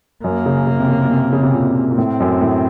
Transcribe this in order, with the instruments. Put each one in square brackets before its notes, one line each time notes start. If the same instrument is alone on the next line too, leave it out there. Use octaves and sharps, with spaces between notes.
[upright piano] F#2 [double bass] A#3
[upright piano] C#3
C#3
C3
C#3
C3
C#3
C3
A#2
A#2
[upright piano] A2 [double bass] C4
[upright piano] F#2
A2